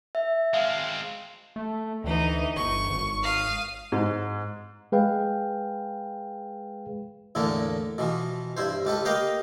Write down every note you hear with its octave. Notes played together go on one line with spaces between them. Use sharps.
E5
G#3 C4 F5
A3
D2 E3 D#4
G1 C#6
G#1
F5 D#6
G#2
G#3 G#4 B4 F5 G5
E2 A2 D3 A#3 A4
B2 E3 F3
G2 E4 C5
C#2 G4 A4 B4
A#3 G4 B4 D#5 F5 G5